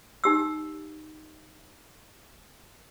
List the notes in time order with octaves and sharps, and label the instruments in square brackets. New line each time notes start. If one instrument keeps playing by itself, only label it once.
[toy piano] D#4 G4 E6